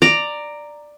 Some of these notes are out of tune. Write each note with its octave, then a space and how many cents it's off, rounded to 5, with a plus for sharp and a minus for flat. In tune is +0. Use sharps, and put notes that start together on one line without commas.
D5 +10 A#5 -5